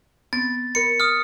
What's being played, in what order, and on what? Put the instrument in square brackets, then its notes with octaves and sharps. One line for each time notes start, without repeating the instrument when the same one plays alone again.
[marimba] B3 C4 [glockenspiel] A6
[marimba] A#4 B5 [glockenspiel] C#7
[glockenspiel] D#6 F6